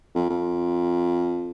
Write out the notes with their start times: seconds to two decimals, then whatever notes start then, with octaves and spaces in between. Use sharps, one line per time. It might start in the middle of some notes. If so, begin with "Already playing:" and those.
0.15 F2
0.30 F2